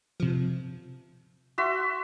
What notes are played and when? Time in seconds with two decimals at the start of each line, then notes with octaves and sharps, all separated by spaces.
0.20 C3 F3
1.58 F#4 E5 C6